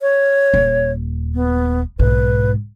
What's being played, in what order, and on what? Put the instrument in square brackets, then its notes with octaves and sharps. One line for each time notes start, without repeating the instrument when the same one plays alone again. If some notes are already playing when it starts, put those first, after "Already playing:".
[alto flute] C#5
[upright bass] D#1
[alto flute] B3
[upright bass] B1 G#2 [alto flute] B4